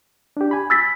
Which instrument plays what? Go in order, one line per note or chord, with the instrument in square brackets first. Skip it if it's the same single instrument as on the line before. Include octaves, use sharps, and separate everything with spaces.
[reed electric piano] D4 G4
G#5 B5
[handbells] E6 A6 B6